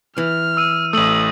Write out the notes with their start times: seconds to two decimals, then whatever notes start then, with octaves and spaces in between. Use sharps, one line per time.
0.18 E3 F6
0.57 E6 D#7
0.93 A1 A3 D#6 E6 F#7